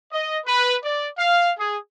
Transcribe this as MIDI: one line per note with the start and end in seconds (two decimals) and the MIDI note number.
0.13 0.38 75
0.46 0.76 71
0.84 1.07 74
1.18 1.51 77
1.58 1.77 68